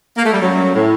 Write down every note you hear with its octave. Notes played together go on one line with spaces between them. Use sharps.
A#3
A3
G3
F#2 F#3
A2